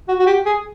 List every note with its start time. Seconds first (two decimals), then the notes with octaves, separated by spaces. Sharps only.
0.08 F#4
0.19 F#4
0.27 G4
0.46 G#4